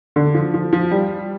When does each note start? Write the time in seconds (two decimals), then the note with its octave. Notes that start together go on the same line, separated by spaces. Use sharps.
0.16 D3
0.34 F3
0.54 F3
0.73 F3
0.91 G3